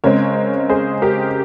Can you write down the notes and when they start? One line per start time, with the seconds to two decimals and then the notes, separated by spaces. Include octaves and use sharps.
0.04 C#3 G#3 C4 A#4 C#5
0.70 G#4 C5
1.02 G4 A#4